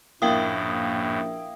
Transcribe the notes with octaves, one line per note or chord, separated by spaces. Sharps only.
A#1 F#2 A2 A#3 E4 E5 G5 D#6